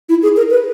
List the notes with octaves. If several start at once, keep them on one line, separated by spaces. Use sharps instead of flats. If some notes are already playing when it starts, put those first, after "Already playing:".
E4
G#4
A#4
B4